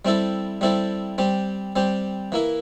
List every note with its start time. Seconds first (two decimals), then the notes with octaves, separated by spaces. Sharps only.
0.05 G3 C4 E4 A4
0.61 G3 C4 E4 A4
1.18 G3 C4 G4
1.76 G3 C4 G4
2.32 E3 A#3 E4